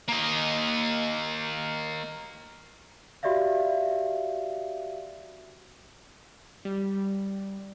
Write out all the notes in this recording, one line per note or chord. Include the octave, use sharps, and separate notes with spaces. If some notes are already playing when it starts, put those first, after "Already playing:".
A#3 D#5
F#4 G4 D5 E5 F5
G3